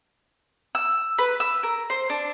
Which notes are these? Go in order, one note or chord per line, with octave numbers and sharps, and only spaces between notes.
E6
B4
E6
A#4
C5
D4